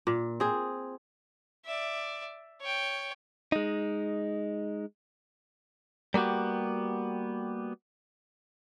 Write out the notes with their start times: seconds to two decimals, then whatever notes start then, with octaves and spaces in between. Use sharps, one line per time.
0.07 A#2
0.40 C4 G#4
1.65 D5 E5
2.61 C#5 G5
3.52 G#3 D#4
6.14 G3 A#3 B3 F#4 G4